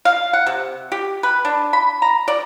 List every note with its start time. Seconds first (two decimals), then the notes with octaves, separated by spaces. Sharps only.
0.05 F5
0.33 F#5
0.47 C3
0.92 G4
1.23 B4
1.45 D4
1.73 B5
2.02 A#5
2.28 D5